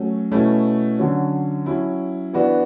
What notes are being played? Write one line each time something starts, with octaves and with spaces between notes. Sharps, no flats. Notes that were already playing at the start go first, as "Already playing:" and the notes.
Already playing: F#3 A3 C#4
B2 A3 C#4 E4
D3 F#3 C#4
F#3 C#4 E4
E3 B3 D4 F#4